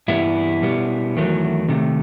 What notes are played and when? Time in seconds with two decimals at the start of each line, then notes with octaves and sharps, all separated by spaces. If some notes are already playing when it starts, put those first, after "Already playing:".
0.08 G2 E3 G3 B3 E4
0.61 B2 G3 B3
1.16 E2 D#3 F#3 A3
1.69 C3 D#3 A3